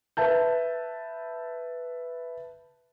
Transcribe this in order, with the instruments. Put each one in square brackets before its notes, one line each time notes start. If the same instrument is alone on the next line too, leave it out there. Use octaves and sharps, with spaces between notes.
[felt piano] B4 E5 A5 G6